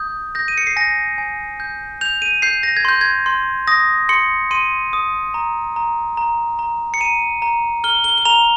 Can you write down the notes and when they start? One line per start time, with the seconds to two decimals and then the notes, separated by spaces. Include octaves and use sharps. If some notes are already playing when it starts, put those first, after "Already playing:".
Already playing: D#6 G6
0.35 G6 A#6
0.48 D#7
0.58 C#7
0.67 C7
0.76 G#5 A#6
1.18 G#5
1.60 G6
2.01 G6 F7
2.22 D#7
2.42 G6 C7
2.63 A#6
2.77 G#6
2.85 C6 G6
3.01 G#6
3.26 C6
3.67 D#6 A#6
4.09 C6 C#7
4.51 C6 D#7
4.93 D#6
5.34 A#5
5.76 A#5
6.17 A#5
6.59 A#5
6.94 C#7
7.01 A#5 D#7
7.42 A#5
7.84 F6 G7
8.04 G7
8.18 G7
8.25 A#5 F7